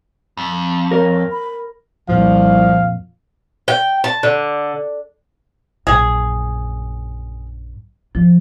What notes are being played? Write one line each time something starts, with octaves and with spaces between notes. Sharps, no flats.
F2
A#4 C#5
B5
C2 F2 A#2 F3 F5
G5
A5
D3
A#1 F#2 G#4
F3 F4